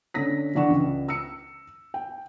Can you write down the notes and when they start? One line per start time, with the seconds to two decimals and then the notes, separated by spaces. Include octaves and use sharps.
0.14 D3 C#4 A#6 B6
0.55 D3 E3 D4 F#5 C#6 E7
0.70 C#2
1.08 E6 C#7
1.94 G5